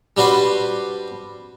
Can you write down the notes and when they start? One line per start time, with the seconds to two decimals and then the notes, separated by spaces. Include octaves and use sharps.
0.17 G3 D4 F#4 B4 C5